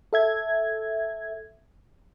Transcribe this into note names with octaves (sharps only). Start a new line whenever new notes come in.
A4 E5 G#6